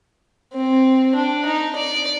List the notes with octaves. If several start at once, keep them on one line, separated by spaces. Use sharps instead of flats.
C4
D4
D#4
D5